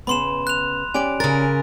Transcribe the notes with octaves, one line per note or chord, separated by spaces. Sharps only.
C#3 B3 B5 C6 E7
F#6 F7
C#4 G4 D5 G#5 D7
C#3 A#4 A6